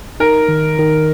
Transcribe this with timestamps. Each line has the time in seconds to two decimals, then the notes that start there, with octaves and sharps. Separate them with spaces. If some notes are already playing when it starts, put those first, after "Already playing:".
0.20 D#4 A#4
0.48 D#3
0.79 D#3